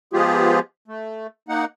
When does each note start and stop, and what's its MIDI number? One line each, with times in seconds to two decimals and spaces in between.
0.13 0.59 53
0.13 0.59 56
0.13 0.59 59
0.13 0.59 65
0.13 0.59 67
0.13 0.59 68
0.88 1.27 57
1.48 1.65 58
1.48 1.65 63
1.48 1.65 78